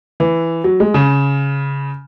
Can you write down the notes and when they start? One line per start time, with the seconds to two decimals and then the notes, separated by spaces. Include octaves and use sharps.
0.20 E3
0.64 F#3
0.80 G#3
0.94 C#3